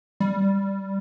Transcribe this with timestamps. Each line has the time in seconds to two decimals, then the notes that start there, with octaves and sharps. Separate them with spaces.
0.20 G3